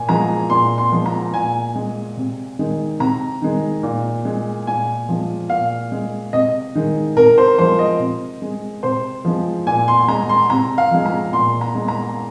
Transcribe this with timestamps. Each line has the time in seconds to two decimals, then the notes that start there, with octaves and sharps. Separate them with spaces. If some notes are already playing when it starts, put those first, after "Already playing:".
Already playing: A#2 G#5
0.09 F3 G#3 A#5
0.50 A#2 C6
0.78 C6
0.92 F3 G#3
1.06 A#5
1.34 A#2 G#5
1.75 G#3
2.17 C3
2.59 D#3 G#3
3.00 C3 A#5
3.42 D#3 G#3
3.83 A#2
4.25 G#3
4.67 A#2 G#5
5.09 F3 G#3
5.50 A#2 F5
5.92 G#3
6.33 C3 D#5
6.75 D#3 G#3
7.17 C3 A#4
7.38 C5
7.58 F3 G#3 C5
7.79 D#5
8.00 C3
8.42 G#3
8.83 C3 C5
9.25 F3 G#3
9.66 A#2 G#5
9.88 C6
10.08 G#3 A#5
10.29 C6
10.50 C3 A#5
10.78 F5
10.91 F3 G#3
11.05 A#5
11.33 A#2 C6
11.61 A#5
11.75 G#3
11.88 A#5